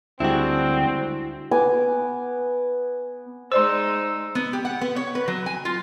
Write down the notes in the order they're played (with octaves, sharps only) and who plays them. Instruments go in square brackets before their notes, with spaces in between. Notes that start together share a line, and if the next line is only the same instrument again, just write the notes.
[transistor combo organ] D2 [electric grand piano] G3 G#3 D4 [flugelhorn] C4 [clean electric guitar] E4 F#4
[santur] B3 G#5 D6
[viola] G#3 D#4 [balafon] C5 D5 C6 [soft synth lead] E6
[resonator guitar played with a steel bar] B3
G4
F#5
B3
C#5
B4
F#3
G#5
F4